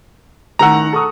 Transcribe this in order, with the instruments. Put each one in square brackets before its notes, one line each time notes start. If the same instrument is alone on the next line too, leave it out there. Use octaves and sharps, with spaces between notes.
[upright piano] A1 D#3 E6 [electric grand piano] F#5 A#5
[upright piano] A4 C#6 D#6